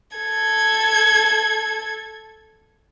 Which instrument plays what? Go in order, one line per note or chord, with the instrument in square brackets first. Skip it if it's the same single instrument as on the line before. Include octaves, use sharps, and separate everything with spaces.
[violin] A4 G#6